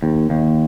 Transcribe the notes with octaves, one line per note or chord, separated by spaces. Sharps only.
D#2
D#2